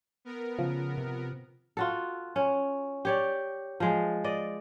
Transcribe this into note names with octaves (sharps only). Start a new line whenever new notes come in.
B3 A#4
C#3 F3
C3
F4 F#4 A4
C#4
G4 C#5 D5
F3 G#3
D5 D#5